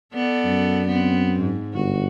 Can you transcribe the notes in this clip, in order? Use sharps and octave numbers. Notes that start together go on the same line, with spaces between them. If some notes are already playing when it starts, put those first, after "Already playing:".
B3 A4 D5
F#2
B3 C4
G#2
G1 F#4